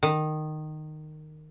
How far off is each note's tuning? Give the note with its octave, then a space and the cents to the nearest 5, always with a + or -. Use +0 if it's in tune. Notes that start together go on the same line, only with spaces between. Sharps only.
D#3 -15